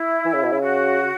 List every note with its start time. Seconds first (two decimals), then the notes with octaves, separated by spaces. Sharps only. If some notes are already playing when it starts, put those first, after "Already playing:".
Already playing: E4
0.25 E3
0.34 C#3
0.43 B2
0.52 C#3
0.61 F#4